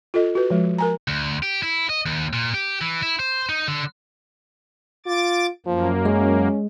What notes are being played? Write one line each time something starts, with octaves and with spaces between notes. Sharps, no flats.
F4 A4 D#5
F#4 B4
F3 G#3
A#4 G#5 A#5
D2
G4
E4
D#5
D#2
A#2
G4
E3
E4
C5
D#4
D3
F4 D6 A6
F#2 F3 A#3
G#3 C#4